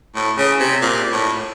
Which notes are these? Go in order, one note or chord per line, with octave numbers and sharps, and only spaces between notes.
A2
C#3
C3
A#2
A2